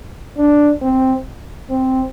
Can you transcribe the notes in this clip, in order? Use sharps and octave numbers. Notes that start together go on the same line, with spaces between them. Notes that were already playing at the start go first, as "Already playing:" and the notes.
D4
C4
C4